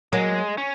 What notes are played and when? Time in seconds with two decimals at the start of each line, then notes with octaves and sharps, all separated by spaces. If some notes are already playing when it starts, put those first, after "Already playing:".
0.13 F#3 G#3 A#3
0.58 C#4